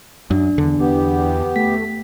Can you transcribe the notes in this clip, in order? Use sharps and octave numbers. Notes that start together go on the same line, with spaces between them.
F#2 D4
E2 D3
E2 B3 G4
A3 B6